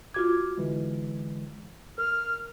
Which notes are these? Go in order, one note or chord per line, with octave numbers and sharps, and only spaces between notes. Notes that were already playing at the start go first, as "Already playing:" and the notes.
F4 F#4 D6 F6 G#6
D3 E3 G#3
A#4 F6